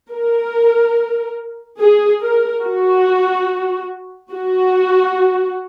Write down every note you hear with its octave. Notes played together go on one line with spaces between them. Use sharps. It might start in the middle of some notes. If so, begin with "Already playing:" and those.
A#4
G#4
A#4
F#4
F#4